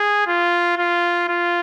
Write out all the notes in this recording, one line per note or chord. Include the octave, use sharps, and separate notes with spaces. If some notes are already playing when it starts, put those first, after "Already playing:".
Already playing: G#4
F4
F4
F4